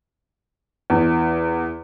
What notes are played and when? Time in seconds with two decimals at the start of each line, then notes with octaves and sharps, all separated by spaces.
0.90 E2